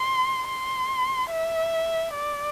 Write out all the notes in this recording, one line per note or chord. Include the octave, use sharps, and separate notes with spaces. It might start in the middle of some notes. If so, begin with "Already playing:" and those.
Already playing: C6
C6
E5
D5